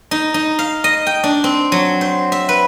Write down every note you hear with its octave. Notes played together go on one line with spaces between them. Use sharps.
D#4
D#4
F5
D#5
G5
D4
C4
F#3
C5
E5
B4